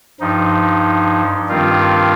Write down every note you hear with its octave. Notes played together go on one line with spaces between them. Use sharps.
G2 F3 D#4
G2 D#3 G3 C4 F4